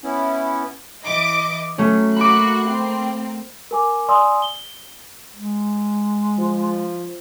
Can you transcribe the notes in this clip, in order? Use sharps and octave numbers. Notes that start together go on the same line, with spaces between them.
B3 C#4 E4
E3 D#5 D6
F#3 A3 C#4
A#3 F#4 B5 D6 F#6
A#3 C4
A#4 G#5 D6
D5 F#5 G#5 C6 D#6 E6
G7
G#3
F3